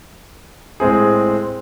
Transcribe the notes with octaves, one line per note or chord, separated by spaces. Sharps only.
A2 G#3 C4 G#4